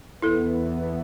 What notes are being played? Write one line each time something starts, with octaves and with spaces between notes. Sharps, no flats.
E2 E3 B3 E4 A4